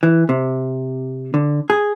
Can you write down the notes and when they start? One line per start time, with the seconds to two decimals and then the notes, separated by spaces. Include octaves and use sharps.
0.03 E3
0.29 C3
1.34 D3
1.70 G#4